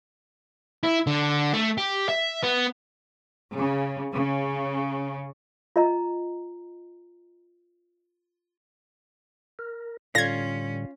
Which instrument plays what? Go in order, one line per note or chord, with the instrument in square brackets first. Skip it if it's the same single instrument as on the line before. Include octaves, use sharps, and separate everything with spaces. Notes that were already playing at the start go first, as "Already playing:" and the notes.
[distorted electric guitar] E4
D3
A3
G4
E5
B3
[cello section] C#3
C#3
[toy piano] F4 D#5 A#5
[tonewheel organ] A#4
[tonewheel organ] A2 D3 G3 [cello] C#4 [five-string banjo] F4 [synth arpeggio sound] G#6 A#6